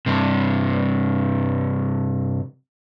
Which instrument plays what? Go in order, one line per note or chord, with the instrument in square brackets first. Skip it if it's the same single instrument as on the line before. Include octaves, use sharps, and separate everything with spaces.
[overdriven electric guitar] G2 C3